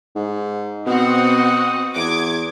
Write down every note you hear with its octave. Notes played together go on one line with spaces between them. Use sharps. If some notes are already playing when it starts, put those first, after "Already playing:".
G#2
B2 C4 F#4 F#5 D#6
E2 D6 G#6